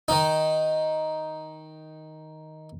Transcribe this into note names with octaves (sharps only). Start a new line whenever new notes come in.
D#3 D#4